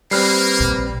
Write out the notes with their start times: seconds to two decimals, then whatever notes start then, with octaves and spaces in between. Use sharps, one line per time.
0.11 G3 A#3 C4 B4 F6 C7
0.59 A#1 A#2